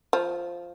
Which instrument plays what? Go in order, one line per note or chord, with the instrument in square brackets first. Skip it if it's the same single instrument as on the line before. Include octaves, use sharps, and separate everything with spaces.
[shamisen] F3